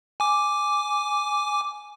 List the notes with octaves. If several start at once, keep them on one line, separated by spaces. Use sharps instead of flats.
G#5 D6